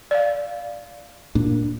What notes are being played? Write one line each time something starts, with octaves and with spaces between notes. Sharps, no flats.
D5 F5
A#2 A#3 D4